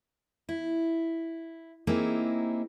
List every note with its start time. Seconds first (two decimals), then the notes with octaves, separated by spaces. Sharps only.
0.49 E4
1.87 A#3 C4 D#4 E4 G4 G#4